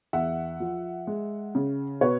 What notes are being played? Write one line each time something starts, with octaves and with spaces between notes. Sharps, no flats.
E2 E5 F#5
F3
G#3
C#3
B2 B4 C#5